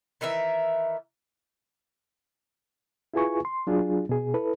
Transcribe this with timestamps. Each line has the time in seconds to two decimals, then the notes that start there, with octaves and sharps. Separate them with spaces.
0.21 D#3 E3 A#4 E5
3.14 E4 F4 G#4 B4 G#5 C#6
3.45 C6
3.67 F#3 D4 F4 G#4
4.09 B2 G#4
4.34 E4 A4 B4